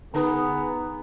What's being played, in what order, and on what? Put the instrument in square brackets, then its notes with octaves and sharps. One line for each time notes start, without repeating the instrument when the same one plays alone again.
[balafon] D3 D#4 B4 [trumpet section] B3 G#4 A#5